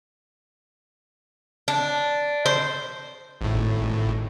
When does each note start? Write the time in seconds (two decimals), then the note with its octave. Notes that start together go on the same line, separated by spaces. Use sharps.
1.68 D4
2.46 C5
3.41 G#1 A2